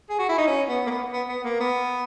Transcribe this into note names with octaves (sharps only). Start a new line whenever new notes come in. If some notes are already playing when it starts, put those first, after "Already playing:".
G#4
F#4
E4
D#4
C#4
B3
A#3
B3
B3
B3
A#3
B3